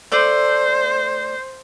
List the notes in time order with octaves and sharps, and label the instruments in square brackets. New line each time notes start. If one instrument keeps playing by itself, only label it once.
[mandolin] A3 D5 [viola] C5